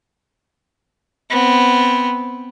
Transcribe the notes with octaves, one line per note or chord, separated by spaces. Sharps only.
B3 C4